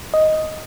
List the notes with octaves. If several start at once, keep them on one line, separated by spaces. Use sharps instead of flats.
D#5